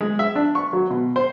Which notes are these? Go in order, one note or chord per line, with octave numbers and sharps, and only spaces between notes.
G#3
E5
D4
C#6
F#3
B2
C5